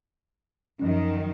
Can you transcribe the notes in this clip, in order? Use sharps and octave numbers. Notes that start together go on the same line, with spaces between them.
F#2 D#3 F3 C#4